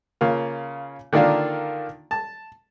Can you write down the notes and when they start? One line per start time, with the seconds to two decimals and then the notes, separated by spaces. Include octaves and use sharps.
0.21 C#3 A#3 F4
1.13 D3 D#3 A#3 D4 F4
2.11 A5